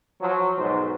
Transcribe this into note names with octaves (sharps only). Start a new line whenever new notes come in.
F3 F#3
B1 G#2 C5